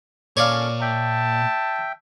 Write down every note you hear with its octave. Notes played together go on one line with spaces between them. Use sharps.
A#2 C#4 A4 C#5 D5 F5
E5 G5 A5